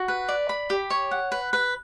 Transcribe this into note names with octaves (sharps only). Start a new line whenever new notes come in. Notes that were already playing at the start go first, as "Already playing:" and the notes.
Already playing: F#4
B4
D5
B5
G4
C#5
F#5
B4
B4